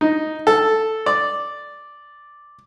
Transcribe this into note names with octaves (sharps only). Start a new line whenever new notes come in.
D#4
A4
D5